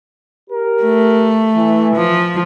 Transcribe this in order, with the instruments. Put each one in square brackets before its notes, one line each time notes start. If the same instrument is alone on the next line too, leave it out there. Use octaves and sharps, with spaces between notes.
[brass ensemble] G4 A#4
[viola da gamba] A3
[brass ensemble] E3
[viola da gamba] F3